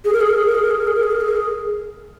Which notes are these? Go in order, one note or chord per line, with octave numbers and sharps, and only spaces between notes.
G#4
A#4
G#4
A#4
G#4
A#4
G#4
A#4
G#4
A#4
G#4
A#4
G#4
A#4
G#4
A#4
G#4